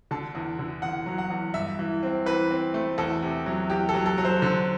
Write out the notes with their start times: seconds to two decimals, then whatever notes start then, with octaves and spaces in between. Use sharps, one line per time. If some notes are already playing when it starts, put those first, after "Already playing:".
0.11 D3 A5
0.35 E2
0.59 D3
0.82 E2 F#5
1.06 F#3
1.18 F#5
1.30 E2
1.54 G2 E5
1.79 E3
2.03 C4
2.26 E3 B4
2.51 C4
2.74 A3
2.98 E2 A4
3.22 C3
3.46 F#3
3.70 E2 G4
3.89 A4
3.94 F#3
4.06 A4
4.18 F#3
4.25 C5
4.42 D3